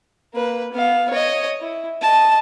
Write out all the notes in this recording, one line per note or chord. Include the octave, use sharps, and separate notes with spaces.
A#3 B4
B3 F5
C#5 D#5
E4
D#5 A5